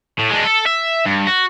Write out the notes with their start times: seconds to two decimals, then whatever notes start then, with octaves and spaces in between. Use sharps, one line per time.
0.19 A2
0.31 G#3 D4
0.44 A4
0.66 E5
1.06 G2
1.27 F#4